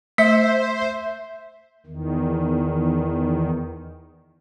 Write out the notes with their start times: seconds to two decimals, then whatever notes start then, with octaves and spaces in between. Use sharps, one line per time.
0.18 A3 C5 E5 B6
1.86 E2 D#3